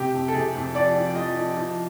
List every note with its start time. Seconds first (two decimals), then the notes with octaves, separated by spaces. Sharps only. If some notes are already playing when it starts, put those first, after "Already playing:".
Already playing: C3 G4
0.14 F2
0.28 A4
0.34 C3 G#4
0.55 F2
0.74 F3 D5
0.95 F3
1.15 F3 D#5
1.36 F3
1.57 F3